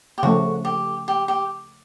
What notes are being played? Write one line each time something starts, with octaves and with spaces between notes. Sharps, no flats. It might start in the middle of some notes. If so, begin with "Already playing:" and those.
G4
C#3 F3 A3 F#4
G4
G4
G4